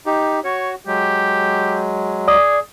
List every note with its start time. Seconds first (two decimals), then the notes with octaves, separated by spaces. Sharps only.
0.06 D#4 G4
0.44 F#4 C#5
0.87 F#3 G#3 G4
2.28 G#4 D5 D#6